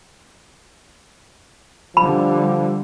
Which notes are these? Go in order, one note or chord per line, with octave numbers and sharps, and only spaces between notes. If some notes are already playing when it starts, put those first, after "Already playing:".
D3 F3 G3 B5